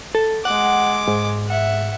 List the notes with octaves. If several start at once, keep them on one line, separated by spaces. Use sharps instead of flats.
A4
G#3 F#5 D6
G#2
E5 F#5